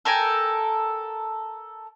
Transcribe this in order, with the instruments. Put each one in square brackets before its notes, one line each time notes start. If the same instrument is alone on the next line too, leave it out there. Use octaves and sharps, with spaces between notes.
[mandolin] A4 A#4 G5 G#5